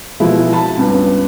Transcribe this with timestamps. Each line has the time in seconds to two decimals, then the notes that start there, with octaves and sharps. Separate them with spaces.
0.20 B2 F3 G#3 E4
0.53 A5 B5
0.77 C#2 G2 B3